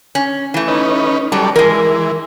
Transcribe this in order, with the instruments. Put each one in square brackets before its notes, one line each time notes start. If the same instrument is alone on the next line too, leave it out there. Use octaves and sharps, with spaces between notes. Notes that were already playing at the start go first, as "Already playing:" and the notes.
[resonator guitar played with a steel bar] C#4
E3 A3
[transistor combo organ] C#4 D#4 B4
[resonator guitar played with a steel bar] F#3 [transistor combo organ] G3 A4 D5
[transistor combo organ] E3 [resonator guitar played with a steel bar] G#3 A#4